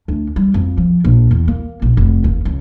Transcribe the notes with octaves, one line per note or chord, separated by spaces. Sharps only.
D2
G3
F2
F3
A#1
E2
A#3
A#1
F1
D#2
C#2